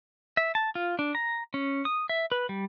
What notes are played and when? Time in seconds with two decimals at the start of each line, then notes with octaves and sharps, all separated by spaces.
0.37 E5
0.55 A5
0.75 F4
0.99 D4
1.15 A#5
1.54 C#4
1.85 D#6
2.09 E5
2.32 B4
2.49 G3